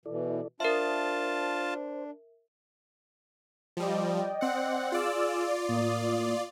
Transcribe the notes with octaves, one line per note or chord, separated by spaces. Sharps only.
B2 E3 E4 A4 D5
D4 F4 A#4 C5 E5 A5
F3 G3 D5 D#5 G5
C4 F#5
F4 G#4 D5 E6
A2 A#3 D#6